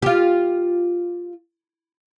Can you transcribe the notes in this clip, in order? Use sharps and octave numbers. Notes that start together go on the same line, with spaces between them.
F4 G4